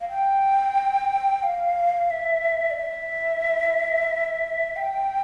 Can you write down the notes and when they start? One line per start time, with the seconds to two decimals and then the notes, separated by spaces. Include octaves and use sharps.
0.01 F5
0.09 G5
1.43 F5
2.10 E5
2.71 D5
2.77 E5
4.76 G5